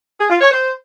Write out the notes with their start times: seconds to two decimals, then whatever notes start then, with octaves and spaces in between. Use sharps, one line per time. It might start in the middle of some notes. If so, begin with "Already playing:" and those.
0.19 G#4
0.30 F4
0.41 C#5
0.51 C5